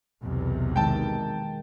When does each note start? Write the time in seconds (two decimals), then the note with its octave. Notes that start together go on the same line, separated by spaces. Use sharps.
0.22 B1 E2 C3
0.76 D#3 G#3 G5 A5